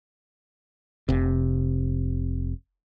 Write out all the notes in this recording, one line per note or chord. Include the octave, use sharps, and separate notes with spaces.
F1 C3